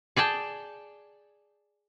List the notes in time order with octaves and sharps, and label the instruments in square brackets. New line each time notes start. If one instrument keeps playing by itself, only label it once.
[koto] G#4 D5 G5 A5